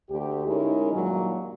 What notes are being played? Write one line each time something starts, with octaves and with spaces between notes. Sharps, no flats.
D2 G4
G#3 C#4 D#4 E4 G#4 A#4
G2 A#2 D#3 F#3